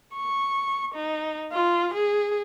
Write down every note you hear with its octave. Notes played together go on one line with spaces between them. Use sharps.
C#6
D#4
F4
G#4